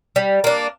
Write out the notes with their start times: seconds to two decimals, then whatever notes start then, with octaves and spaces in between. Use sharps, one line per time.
0.16 G3
0.44 A#3 D4